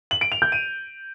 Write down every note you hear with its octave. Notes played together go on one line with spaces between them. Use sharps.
F#7
D7
F7
G6
D#7